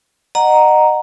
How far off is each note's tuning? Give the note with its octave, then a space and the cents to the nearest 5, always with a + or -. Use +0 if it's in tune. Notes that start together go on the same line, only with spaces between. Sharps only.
D#5 -30 F#5 +0 A#5 +0